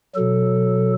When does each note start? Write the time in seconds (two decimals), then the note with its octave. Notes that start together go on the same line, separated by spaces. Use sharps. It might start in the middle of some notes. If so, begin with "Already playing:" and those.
0.15 B2 F#3 A4